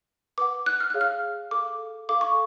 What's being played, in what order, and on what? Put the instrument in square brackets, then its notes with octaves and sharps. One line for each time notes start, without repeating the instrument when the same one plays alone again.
[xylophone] B4 F#5 D6
F#6
F6
G#4 C#5 F5 F#6
F6
A4 F5 D6
A4 F5 D6
C#6